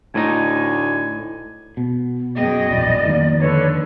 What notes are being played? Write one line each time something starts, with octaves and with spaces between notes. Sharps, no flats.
D2 A2 D#4 G#5
B2
F#2 B3 G#4 D#5 G5
E1 A#1 D5
F2 D#3 A#3
D3 A4 B4 C#5